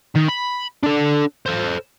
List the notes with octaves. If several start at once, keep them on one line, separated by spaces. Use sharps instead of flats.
D#3
B5
D4 A4
A4 C5